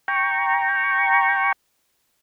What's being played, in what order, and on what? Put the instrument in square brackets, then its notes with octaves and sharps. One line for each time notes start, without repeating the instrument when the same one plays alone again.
[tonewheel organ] G5 A#5 C#6